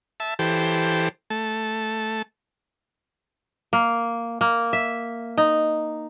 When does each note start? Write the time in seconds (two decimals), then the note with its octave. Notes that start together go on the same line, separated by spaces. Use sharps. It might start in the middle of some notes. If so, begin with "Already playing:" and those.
0.20 E5 A5
0.39 E3 G4 A4 C5
1.30 A3 A5
3.73 A#3
4.41 A#3
4.73 E5
5.38 D#4